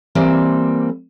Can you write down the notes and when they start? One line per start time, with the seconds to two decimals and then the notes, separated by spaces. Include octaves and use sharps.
0.15 E3 G3 A#3 C4